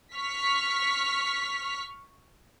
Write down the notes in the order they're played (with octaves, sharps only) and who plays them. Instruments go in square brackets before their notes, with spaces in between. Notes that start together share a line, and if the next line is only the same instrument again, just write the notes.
[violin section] C#6 F6 B6